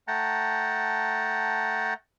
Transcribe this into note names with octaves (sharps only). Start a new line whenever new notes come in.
A3 F#5 G5 A5 A#5